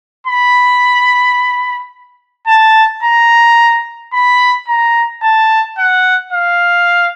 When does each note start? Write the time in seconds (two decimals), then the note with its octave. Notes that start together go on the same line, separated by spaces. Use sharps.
0.27 B5
2.47 A5
3.03 A#5
4.13 B5
4.67 A#5
5.23 A5
5.78 F#5
6.33 F5